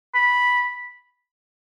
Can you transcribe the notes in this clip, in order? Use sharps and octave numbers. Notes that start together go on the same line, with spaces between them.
B5